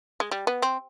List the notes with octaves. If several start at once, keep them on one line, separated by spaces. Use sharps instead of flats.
G#3
G3
B3
C4